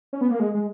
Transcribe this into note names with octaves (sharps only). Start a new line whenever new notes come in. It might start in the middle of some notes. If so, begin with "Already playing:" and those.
C#4
B3
A#3
G#3
G#3